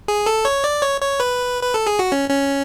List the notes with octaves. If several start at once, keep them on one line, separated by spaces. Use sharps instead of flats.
G#4
A4
C#5
D5
C#5
C#5
B4
B4
A4
G#4
F#4
C#4
C#4